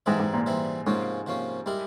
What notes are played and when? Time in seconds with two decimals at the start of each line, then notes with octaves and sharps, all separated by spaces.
0.06 G#2 E3 G3 C4 E4
0.20 G#2
0.34 A#2
0.46 E3 G3 C4 E4
0.86 G#2 C3 F3 A#3 C#4
1.26 C3 F3 A#3 C#4
1.66 G3 G#3 E4 A#4